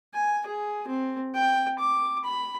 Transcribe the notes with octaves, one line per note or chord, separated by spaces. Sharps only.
G#5
G#4
C4
G5
D6
B5